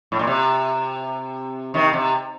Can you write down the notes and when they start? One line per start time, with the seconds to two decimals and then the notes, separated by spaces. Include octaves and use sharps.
0.12 A2
0.19 A#2
0.27 C3
1.74 C3 D#3
1.93 C3